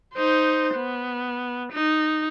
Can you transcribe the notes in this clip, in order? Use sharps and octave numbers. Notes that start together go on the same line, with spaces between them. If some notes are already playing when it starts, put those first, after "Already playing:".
D#4 C5
B3
D#4